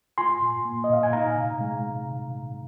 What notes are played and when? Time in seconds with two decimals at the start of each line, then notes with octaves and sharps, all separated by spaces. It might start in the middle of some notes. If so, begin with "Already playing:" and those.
0.18 F4 G#5 C6
0.42 A#2
0.65 A#3
0.84 D#5
0.90 A#2 F5
1.03 G#5
1.13 D#4 F5 A#5
1.36 C3
1.61 G#3
1.84 C3